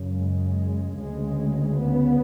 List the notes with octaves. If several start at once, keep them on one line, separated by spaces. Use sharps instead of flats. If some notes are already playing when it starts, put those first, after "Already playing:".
Already playing: F#2 C#3
G#3
D2 C#3 G#3
B3